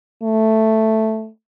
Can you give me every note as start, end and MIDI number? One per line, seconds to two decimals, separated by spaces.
0.23 1.29 57